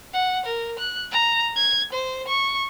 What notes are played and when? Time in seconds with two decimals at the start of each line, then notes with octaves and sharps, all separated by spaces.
0.14 F#5
0.46 A#4
0.79 F#6
1.12 A#5
1.56 G#6
1.93 C5
2.28 C#6